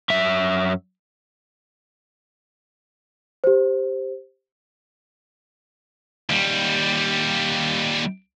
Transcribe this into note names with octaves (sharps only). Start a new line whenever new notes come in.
F#2 E5
G4 C5
D#2 G3